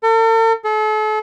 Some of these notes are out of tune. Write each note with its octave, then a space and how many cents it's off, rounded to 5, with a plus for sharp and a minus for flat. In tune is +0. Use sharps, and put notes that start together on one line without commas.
A4 +45
A4 -40